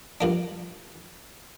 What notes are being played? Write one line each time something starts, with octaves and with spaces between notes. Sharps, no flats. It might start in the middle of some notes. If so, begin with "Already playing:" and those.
G2 F3 A#3 D4